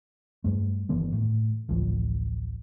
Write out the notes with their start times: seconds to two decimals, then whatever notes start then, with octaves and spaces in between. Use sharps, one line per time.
0.44 G2 A3
0.89 G1 D#3 E3 B3
1.13 A2
1.69 A1 D2 F3